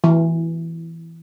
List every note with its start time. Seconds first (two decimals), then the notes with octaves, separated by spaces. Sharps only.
0.04 E3